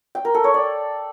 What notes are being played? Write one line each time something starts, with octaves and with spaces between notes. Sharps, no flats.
G5
A#4
A4
C#5
D5